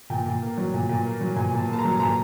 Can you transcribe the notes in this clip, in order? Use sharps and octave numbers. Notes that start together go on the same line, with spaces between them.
A#2 G5
A#2
A#3
F#3
A#2
A#2
A#3
F#3
A#2 G#5
A#2 A5
A#3 A5
A#5
F#3
A#2 A#5